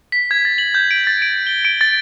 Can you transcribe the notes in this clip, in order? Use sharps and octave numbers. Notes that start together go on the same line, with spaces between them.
B6
G#6
A6
F#7
G6
D7
A6
D7
G7
D7
A6